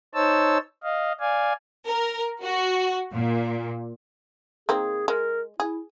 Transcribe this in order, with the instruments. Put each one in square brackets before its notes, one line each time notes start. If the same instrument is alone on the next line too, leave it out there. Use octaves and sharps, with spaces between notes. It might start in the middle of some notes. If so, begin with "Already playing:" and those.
[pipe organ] D#4 C5 C#5 A5 E6
D#5 F5
D5 F5 G#5
[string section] A#4
F#4
A#2
[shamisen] D#3 A#3 C4 [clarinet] G#4
[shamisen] G#3 [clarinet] A#4
[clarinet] E4 [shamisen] G#4